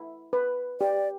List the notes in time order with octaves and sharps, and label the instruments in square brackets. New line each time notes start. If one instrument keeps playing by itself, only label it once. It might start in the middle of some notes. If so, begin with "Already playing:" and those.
Already playing: [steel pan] E4
B4
[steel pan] G4 [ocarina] D5